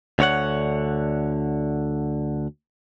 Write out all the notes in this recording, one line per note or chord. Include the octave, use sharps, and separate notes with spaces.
D2 D3 C#5 F#5